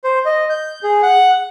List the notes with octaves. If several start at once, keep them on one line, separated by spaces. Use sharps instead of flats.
C5
D#5
G6
G#4
F#5